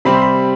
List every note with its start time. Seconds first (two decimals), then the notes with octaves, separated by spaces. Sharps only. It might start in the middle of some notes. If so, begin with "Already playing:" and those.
0.05 C3 G3 C4 B5
0.14 C6
0.22 B5